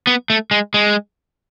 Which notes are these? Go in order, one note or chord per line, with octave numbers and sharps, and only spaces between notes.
B3
A3
G#3
G#3